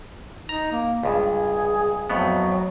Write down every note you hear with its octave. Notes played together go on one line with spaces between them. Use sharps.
D#4 A#5
A#3
C#2 G2 G#4
F2 A2 F#3 B3